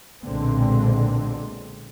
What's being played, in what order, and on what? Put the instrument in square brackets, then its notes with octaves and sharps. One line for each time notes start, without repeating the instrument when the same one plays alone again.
[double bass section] B1 A#2 D3 G#3 C4